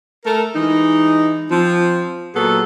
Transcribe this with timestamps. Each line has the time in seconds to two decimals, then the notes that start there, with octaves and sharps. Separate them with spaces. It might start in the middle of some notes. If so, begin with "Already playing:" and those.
0.24 A3 A4 A#4
0.55 E3 G#3 D#4
1.50 F3 C4
2.34 A#2 F#3 B3 G#4 A4